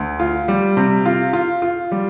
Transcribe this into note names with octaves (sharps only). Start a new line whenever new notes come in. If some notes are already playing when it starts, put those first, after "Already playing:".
Already playing: D2
F4
G3
C3
F4
F4
F4
G3